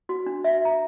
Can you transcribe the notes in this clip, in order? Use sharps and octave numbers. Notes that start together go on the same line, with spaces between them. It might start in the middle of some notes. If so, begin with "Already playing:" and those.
F#4
D4
E5
A#5